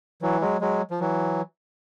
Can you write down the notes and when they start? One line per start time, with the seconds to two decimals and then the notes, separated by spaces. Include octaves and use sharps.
0.22 E3 F#3
0.41 F#3 G#3
0.61 F#3 G#3
0.91 F3
1.00 E3 F#3